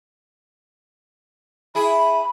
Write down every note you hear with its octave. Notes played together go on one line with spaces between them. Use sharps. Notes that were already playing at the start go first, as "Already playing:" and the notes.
E4 G#4 B5